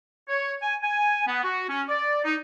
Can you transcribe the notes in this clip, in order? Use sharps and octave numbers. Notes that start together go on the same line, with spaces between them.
C#5
G#5
G#5
B3
F#4
C#4
D5
D#4